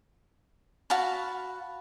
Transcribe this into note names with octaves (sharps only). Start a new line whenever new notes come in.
F#4 F5 A5 B5